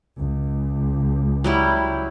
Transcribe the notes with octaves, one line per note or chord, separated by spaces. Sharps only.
C#2
F#3 G3 E4